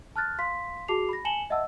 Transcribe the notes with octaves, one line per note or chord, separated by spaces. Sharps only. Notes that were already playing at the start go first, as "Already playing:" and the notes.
A5 F6 F#6 A6
F5 C6 B6
F#4 G#4 A5 D6 C7 F7
B5 A#6
G#5 A5 C#7 E7 F#7 G7
D#5 E5 F#5 A5 E6